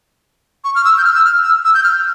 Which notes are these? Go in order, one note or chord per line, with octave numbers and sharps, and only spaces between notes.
C#6
F6
E6
G6
F6
E6
F6
E6
E6
G6
F6